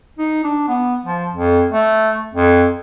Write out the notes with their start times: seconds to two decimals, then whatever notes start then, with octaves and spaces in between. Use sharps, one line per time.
0.18 D#4
0.44 D4
0.68 B3
1.06 F3
1.33 F2
1.72 A3
2.34 F2